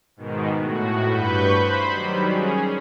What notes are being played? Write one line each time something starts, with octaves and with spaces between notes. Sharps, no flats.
G#2 B2 D#3
A2 F#4
G2 B4 B5 C#6 G6
C5 B5
D#3 F#3 G3
C#4 G#4